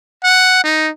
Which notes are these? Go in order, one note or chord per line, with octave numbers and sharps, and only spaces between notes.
F#5
D#4